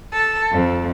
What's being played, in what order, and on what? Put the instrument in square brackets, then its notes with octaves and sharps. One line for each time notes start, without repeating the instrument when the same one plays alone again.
[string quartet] A4
F2